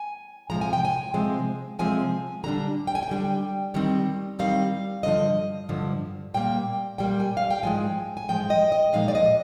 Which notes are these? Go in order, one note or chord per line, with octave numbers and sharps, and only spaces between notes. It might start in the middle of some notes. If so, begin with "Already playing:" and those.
Already playing: G#5
C3 F3 G#3 A#5
G#5
G5
G#5
C3 F3 G#3 C4
C3 F3 G#3 C4 G#5
D3 G3 D4 A#5
G5
G#5
G5
D3 G3 D4
D#3 G3 C4 D#4
D#3 G3 C4 D#4 F5
G2 D3 F3 D#5
G2 D3 F3
A#2 G3 A#3 G5
A#2 G3 A#3 G5
G#5
F5
G5
G#2 F3 G#3 G#5
G#5
G#2 F3 G#3 G5
D#5
D#5
A#2 F3 G#3 D#4 F5
D5
D#5